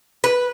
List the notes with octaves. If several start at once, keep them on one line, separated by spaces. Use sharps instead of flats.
B4